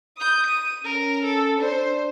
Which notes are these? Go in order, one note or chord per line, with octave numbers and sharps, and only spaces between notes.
D#6 G6
D#7
C#4 A#4
A4
D4 C5